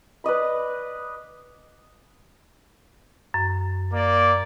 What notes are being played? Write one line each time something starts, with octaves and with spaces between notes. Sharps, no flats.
B4 D5 D#5 B5
F#2
A#3 D5